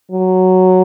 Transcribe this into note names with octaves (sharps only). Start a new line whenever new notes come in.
F#3